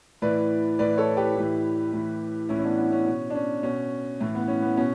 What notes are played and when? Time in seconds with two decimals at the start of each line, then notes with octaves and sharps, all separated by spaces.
0.22 A2 E3 B4 D5
0.79 A2 E3 B4 D5
0.98 A4 C#5
1.17 G4 B4
1.36 A2 E3
1.93 A2 E3
2.49 A2 E3 C#4 E4
2.59 C#4
2.64 B3 D4
2.78 B3 D4
2.92 C#4
3.06 B2 C#4
3.30 D4
3.35 C#4
3.63 B2 C#4
4.20 A2 E3
4.35 B3
4.48 C#4
4.62 B3
4.77 B2 C#4